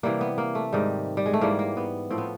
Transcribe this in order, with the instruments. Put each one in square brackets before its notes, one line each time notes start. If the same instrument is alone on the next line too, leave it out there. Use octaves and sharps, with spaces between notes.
[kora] C3 E3 G3 A#3
B3
A#3
A3
G#2 D#3 G3
G3
G#3
A3
G#2 E3 G3 A#3
A#3
B3
A2 F3 C4
B3